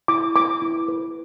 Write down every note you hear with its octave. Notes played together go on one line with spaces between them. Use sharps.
E4 D6
B4 D6
E4
B4